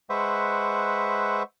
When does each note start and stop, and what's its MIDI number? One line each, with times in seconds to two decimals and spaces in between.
0.10 1.43 56
0.10 1.43 71
0.10 1.43 72
0.10 1.43 76
0.10 1.43 78
0.10 1.43 85